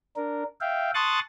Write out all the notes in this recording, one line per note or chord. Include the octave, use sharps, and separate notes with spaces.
D4 A#4
E5 F5 G5
A5 C6 C#6 D#6 F#6 A6